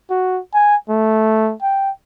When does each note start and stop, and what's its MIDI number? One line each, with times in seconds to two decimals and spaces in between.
0.10 0.40 66
0.54 0.76 80
0.90 1.54 57
1.62 1.91 79